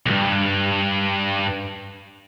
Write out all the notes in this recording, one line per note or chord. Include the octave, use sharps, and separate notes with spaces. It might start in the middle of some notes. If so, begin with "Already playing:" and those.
B1 G2